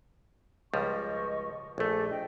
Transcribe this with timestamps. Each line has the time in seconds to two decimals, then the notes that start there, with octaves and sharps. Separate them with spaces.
0.74 C#2 F3 G3 D#5 C#6
1.78 A#1 A3 D4 A4 G#5
2.09 D#5 G5